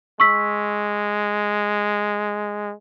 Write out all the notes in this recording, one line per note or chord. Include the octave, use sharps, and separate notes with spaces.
G#3 C#6 E6 B6